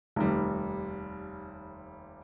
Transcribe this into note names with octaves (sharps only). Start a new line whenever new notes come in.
F1 D#2 G3